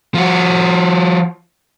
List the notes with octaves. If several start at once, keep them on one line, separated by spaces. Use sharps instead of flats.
F3 F#4